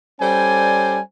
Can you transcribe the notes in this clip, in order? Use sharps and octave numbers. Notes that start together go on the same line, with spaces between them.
G3 C#4 A4 C5 D5 G#5